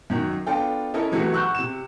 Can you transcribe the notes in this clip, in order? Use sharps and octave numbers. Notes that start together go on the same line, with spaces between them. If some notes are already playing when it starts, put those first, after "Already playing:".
F#2 D#3 F#3
B3 D4 F4 A4 G5
C#4 E4 A4 A#4 D#5
C3 E3 F#3 A3 F#4
F#5 C#6 E6 F#6 G6
C3 E7